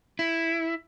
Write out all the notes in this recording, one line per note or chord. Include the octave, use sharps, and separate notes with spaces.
E4